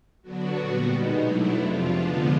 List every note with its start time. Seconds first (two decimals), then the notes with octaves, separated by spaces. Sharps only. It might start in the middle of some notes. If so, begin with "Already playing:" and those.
0.22 D3 F#3 B3 D4 F#4
0.56 A#2 G3 B3
0.88 B2 G#3 B3 D#4
1.21 B2 F#3 A3 D4 E4
1.54 F2 C3 F3 F4
1.86 D3 F3 G#3 B3 D4